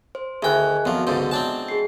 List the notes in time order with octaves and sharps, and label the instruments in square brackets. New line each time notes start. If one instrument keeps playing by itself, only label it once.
[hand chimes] C5
[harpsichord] D2 G5 [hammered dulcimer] D#3 E4 [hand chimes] G#4 G#5 F#6
[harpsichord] F2 F3 [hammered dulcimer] F#3 C6 [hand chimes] B3
[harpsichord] C#2 G#2 D3 [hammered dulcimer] C5 D5
[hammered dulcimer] G#3 [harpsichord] C4 D4 A5
[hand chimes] G#4 C7